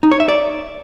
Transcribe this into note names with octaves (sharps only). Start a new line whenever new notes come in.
D#4
C#5
E5
D5